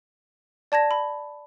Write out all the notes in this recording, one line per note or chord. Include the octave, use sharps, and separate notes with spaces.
D5 A5 G#6 A#6
B5